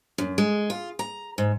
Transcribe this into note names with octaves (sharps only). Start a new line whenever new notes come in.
F#2
G#3
F4
A#5
G#2